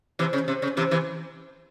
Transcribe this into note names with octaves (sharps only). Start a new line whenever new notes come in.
C3 E3
C#3
C3
C#3
C3 E3
C3 E3